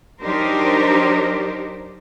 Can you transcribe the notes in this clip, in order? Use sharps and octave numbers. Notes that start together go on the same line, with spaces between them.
F#3 D4 D#4 G4 A#4 C5